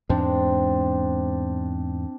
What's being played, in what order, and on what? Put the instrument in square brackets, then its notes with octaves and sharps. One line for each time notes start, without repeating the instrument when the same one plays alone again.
[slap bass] E2 G#2 G#3 [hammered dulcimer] C4 D4